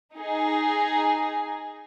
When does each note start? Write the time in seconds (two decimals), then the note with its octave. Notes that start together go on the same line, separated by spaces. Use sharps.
0.15 D#4 G#4